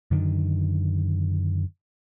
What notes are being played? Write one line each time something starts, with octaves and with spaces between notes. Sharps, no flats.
F#2 D3 D#3